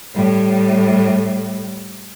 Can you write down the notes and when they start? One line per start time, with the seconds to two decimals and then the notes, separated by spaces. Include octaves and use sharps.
0.15 A2 G3